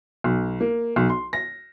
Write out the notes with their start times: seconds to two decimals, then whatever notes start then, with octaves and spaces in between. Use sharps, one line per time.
0.24 B1
0.60 A#3
0.96 B1
1.10 C6
1.33 A#6